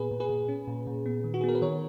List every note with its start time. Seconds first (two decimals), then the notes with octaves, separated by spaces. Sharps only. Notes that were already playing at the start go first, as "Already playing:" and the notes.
Already playing: A#2 B3 G#4 B4
0.11 A#2
0.20 G#4 B4
0.30 A#2
0.48 C#4
0.67 A#2
0.87 A#2
1.06 B3
1.24 D#3
1.34 F#4
1.41 G#4
1.44 B3 A#4
1.55 B4
1.62 D#3 A#4 C#5